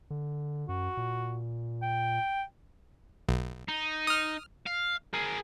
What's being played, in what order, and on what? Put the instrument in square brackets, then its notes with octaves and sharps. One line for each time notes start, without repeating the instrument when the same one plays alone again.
[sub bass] D3
[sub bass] F#2 [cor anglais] F#4
[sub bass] A#2
[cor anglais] G5
[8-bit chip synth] B1
[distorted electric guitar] D#4
[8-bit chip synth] D#6 F6
[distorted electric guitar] F5
G#4 A#4